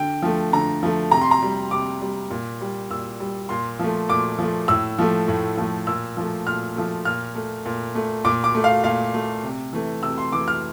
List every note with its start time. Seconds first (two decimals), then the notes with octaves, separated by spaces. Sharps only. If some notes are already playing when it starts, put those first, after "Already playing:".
Already playing: D3 G5
0.22 F3 A3
0.53 D3 A#5
0.83 F3 A3
1.11 C3 A#5
1.21 C6
1.31 A#5
1.42 G3
1.71 C3 D6
2.01 G3
2.30 A#2
2.61 G3
2.90 A#2 E6
3.20 G3
3.49 A#2 C6
3.79 F3 A3
4.09 A#2 D6
4.38 F3 A3
4.68 A2 E6
4.98 F3 A3
5.28 A2
5.57 F3 A3
5.87 A#2 E6
6.17 F3 A3
6.47 A#2 F6
6.76 F3 A3
7.05 A#2 F6
7.35 A3
7.65 A#2
7.95 A3
8.25 A#2 D6
8.44 D6
8.54 A3
8.64 F5
8.84 A#2 F5
9.14 A3
9.43 C3
9.73 E3 A3
10.03 C3 E6
10.18 C6
10.32 E3 A3 D6
10.48 F6